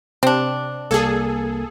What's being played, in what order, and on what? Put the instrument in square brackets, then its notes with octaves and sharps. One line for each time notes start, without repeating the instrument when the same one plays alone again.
[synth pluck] C3 [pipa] C4 D4
[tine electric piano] C2 A#3 G#6 [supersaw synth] G#4 A4